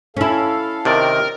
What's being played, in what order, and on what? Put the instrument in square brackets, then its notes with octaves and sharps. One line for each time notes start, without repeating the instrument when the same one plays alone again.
[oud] C#4 E4 [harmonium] A4 F5
[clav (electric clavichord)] C3 D#3 D5 [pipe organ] A#4